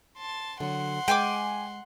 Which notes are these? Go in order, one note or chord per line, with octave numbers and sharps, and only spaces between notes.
A5 C6
D3 F#3 F#5 C6
G#3 G5 G#5 D6